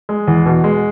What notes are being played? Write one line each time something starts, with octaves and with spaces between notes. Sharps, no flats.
G#3
E2
B2
G#3